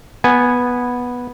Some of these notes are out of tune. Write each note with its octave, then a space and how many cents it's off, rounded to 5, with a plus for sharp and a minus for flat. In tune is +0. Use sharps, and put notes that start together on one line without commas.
B3 -10 G#5 -10